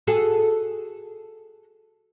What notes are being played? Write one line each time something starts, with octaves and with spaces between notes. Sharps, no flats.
F#4 G#4 A4